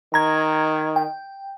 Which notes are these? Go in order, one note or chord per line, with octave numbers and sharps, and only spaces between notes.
D#3 A#5 G#6
G5